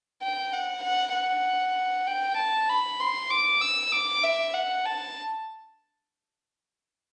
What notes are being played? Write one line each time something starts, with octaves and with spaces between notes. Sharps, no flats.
G5
F#5
F#5
F#5
G5
A5
B5
C6
D6
E6
D6
E5
F#5
A5